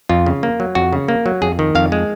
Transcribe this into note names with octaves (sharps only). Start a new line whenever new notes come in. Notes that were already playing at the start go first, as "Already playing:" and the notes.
F2 F4
C#3
A#3
F#3
F2 F#4
C#3
A#3
F#3
F2 G#4
D#3
F2 F5
G#3